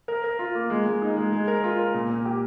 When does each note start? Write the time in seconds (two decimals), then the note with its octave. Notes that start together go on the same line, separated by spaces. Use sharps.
0.08 A#4
0.24 A#4
0.39 F4
0.55 A#3
0.70 G#3
0.86 G#3
1.02 D#4
1.17 G#3
1.32 G#3
1.48 A#4
1.64 F4
1.79 A#4
1.94 A#2
2.10 A#2
2.25 G4